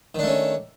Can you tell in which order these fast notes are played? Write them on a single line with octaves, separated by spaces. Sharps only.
D#3 D4 A3 C#4